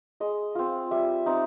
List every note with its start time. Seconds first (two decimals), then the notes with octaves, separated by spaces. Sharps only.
0.20 G#3 D#5
0.55 C4 F4
0.91 G3 E5
1.26 C4 D#4